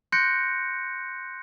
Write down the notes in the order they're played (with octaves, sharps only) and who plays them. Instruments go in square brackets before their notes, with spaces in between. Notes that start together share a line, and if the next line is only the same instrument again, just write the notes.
[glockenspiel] C6 F#6 G6 A#6 C#7 D7